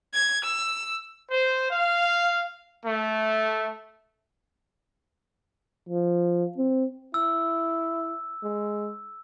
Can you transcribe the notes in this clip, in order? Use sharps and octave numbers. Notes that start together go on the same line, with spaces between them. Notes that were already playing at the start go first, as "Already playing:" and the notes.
G#6
E6
C5
F5
A3
F3
C4
E4 E6
G#3